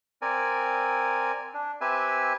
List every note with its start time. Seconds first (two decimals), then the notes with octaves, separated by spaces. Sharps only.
0.22 C4 A#4 D5 G#5
1.54 D4
1.81 C4 G4 B4 E5 G#5